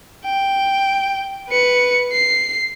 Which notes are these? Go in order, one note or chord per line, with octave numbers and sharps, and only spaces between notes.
G5
B4 C#7
C7